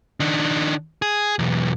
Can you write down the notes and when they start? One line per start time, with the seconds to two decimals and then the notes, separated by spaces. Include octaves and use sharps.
0.20 D#3 D4
1.02 G#4
1.39 B1 E2